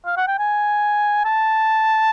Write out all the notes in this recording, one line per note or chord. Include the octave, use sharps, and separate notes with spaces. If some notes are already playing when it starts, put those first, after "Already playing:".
F5
F#5
G5
G#5
A5